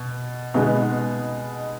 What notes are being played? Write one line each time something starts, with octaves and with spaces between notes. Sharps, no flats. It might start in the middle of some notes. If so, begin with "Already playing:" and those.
Already playing: B2
B2 G#3 B3 D#4